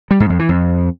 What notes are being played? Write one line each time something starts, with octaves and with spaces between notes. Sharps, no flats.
G3
G#2
F2
E3
F2